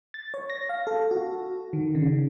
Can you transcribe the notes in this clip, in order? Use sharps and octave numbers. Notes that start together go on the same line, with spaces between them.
A6
C#5
A#6
F5
A4
F#4
D#3
C#3